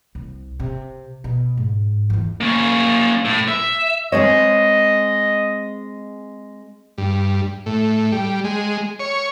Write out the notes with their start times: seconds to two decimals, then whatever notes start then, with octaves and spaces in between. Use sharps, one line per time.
0.15 C2
0.60 C3
1.24 B2
1.57 G#2
2.10 E2 E3
2.41 A#3 C#4
3.25 A2
3.48 E5
4.12 G#3 C4 C#5 D#5
6.98 G2
7.66 A2
8.12 G3
8.44 G#3
9.00 C#5